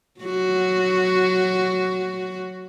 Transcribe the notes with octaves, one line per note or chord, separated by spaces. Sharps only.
F#3 F#4